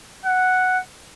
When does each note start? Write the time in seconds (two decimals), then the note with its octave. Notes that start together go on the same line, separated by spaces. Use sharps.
0.25 F#5